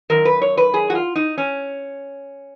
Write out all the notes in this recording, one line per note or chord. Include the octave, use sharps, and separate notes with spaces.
F#2 D#3 A#4
B4
C#5
B4
G#4
F#4
F4
D#4
C#4